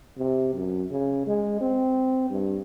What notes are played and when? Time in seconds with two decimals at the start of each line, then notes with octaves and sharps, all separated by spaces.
0.18 C3
0.54 F#2
0.91 C#3
1.27 G#3
1.61 C4
2.30 G2